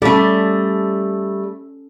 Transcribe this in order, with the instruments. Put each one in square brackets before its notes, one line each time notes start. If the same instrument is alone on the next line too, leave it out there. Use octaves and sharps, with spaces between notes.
[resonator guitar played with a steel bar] G3 A3 [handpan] C#4 A4